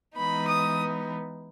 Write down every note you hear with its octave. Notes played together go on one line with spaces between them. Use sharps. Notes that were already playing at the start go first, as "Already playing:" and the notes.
E3 G#3 B3 D#4 B5
D#6